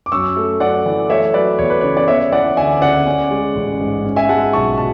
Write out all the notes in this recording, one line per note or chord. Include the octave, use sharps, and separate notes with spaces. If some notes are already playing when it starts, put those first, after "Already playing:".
D6
F#2 C#6 E6
A3
F#2 D5 F#5
E3
A3 C#5 E5
F#3 B4 D5
E2 C#5
B4
C#3 C#5
D5
B3 C#5 E5
E3 D5 F#5
D2 E5 G#5
C#3 D5 F#5
C#4
G#3
A1
G#2
C#4
E5 G#5
G#3 F#5 A5
B1 A5 C#6
B2 A5